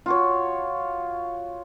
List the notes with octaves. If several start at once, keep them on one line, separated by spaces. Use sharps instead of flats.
F4 F#4 C#5